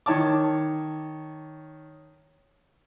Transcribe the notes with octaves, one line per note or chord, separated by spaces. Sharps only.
D#3 C#5 A5 D6